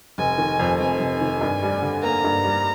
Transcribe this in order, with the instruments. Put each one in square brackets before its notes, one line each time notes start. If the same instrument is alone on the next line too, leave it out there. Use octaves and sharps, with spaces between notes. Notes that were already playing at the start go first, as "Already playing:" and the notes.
[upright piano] F1 [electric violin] G#5
[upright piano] D#3
F2
[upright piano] F1 [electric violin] G#5
[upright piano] F1
D#3
G2
G3
D3
[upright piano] A#3 [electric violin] A#5
[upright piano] G2
G3